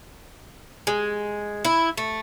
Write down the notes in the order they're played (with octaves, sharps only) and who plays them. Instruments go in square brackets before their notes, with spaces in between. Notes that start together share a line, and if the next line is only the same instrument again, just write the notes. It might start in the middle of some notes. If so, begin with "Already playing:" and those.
[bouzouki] G#3
E4
A3